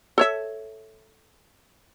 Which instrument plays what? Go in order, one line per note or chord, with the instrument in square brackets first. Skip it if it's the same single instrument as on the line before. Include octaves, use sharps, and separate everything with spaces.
[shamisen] A4 C#5 E5